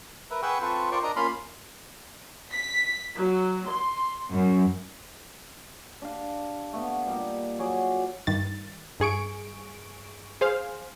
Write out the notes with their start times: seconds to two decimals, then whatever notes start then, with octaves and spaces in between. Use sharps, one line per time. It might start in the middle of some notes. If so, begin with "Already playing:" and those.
0.30 A#4 B4 E5
0.42 G#4 B4 F#5 G5 C#6 E6
0.62 C4 F4 A4 B4 C5 C#6
0.92 F4 A#4 C5 D5 G5 C#6
1.03 D4 A#4 D#5 A#5
1.16 A#3 C#4 F4 F5 B5 C6
2.53 B6
3.17 F#3
3.69 C6
4.32 F#2
6.02 D4 G4 F5
6.73 A3 B3
7.06 A#2 G3 D#4
7.59 F#3 G#4 D5
8.27 G2 D#3 A6
9.00 G2 G#4 C#6 D7
10.41 G#4 C5 F5